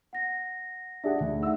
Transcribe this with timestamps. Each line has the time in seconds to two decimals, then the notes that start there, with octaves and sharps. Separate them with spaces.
0.13 F#5 A#6
1.04 D4 G#4 E5 F#5
1.20 D2
1.43 D#4 E5 F#5 E6